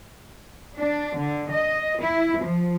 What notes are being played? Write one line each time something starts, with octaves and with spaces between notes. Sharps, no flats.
D4
D3
D#5
E4
F3